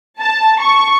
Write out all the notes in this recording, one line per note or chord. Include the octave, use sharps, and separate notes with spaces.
A5
C#6